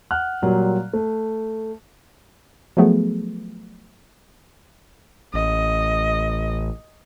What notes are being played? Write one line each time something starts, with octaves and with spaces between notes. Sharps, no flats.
F#5 F6 F#6
A#2 F#3 G3 A#3
A3
F3 F#3 A3 B3 G#4
A1 D#5